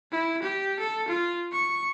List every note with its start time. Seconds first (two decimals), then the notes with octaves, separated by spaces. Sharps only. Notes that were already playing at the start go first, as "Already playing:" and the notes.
0.12 E4
0.42 G4
0.79 A4
1.08 F4
1.52 C#6